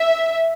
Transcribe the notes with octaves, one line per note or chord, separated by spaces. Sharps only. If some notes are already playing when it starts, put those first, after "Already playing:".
Already playing: E5